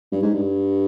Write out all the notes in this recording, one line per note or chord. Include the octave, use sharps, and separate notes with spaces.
G2
G#2
G2